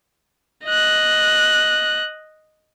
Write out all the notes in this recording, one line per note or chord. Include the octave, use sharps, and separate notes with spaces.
D#5 F#6